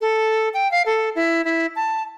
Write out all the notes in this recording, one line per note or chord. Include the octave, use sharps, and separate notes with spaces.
A4
G5
F5
A4
E4
E4
A5